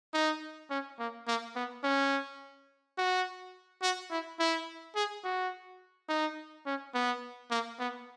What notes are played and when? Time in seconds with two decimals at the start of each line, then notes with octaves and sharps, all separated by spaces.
0.14 D#4
0.70 C#4
0.99 A#3
1.27 A#3
1.56 B3
1.84 C#4
2.98 F#4
3.82 F#4
4.11 E4
4.40 E4
4.96 G#4
5.24 F#4
6.09 D#4
6.66 C#4
6.95 B3
7.51 A#3
7.80 B3